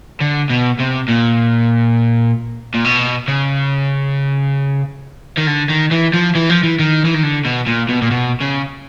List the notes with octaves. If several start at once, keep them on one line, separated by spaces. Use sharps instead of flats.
D3
B2
C3
A#2
A#2
B2
C#3
D#3
D3
D#3
E3
F3
E3
F3
E3
D#3
E3
D#3
D3
B2
A#2
B2
A#2
B2
C#3